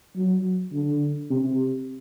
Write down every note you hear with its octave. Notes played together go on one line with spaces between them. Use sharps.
F#3
D3
C3